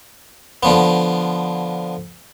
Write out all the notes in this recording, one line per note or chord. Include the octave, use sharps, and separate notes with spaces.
D3 F3 B3